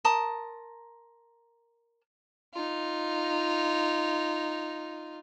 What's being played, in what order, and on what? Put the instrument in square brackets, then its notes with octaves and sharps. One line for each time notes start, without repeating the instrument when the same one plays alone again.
[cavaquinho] A#4 A5 C6 D#6
[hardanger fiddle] D#4 F4